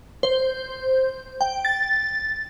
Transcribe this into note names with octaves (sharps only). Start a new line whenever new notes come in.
C5
G5
A6